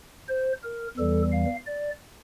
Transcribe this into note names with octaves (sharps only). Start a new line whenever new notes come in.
C5
A#4
E2 E3 G3 A4
F5
D5